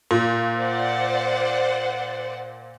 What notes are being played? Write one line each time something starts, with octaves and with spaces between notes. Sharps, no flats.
A#2
C5 D5 F#5